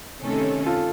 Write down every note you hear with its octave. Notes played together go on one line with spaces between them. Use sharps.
C3 D#3 A3 C#4 A4
F4 A4